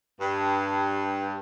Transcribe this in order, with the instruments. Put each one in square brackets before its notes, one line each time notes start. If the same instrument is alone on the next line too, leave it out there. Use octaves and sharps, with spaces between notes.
[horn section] G2